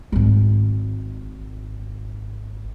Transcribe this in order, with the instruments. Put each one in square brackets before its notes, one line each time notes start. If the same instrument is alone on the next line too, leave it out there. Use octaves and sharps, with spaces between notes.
[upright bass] G#1 G#3